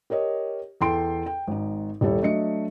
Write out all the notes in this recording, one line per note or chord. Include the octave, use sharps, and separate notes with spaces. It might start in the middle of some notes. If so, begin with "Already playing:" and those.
G4 A#4 C#5 D#5
E2 A4 G5 C6 D7
G5
G#1 D#4
D#1 G3 E4 A4 C#5
F#3 A3 D4 D#5 C#7